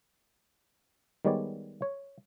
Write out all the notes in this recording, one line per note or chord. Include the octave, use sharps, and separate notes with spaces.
D#3 G3 G#3 B3 C#5 D5
C#5